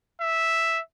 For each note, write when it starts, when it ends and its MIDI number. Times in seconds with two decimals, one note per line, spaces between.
0.21 0.80 76